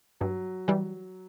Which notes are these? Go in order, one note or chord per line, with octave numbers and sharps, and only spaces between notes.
G2 F#3
E3 G3